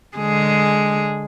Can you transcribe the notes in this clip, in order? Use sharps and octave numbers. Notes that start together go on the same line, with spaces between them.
D3 G#3 G#4